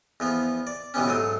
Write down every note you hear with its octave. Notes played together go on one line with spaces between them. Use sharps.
E2 F3 B3
D5
B2 E3 G3 B3 C#4
G#2 F#3 A3 D#6